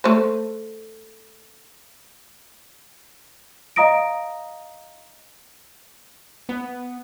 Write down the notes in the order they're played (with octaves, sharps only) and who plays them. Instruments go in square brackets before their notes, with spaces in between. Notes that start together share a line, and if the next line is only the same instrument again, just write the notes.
[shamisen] A3 C5
[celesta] D#5 F5 A#5 D#6 A#6 D7
[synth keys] B3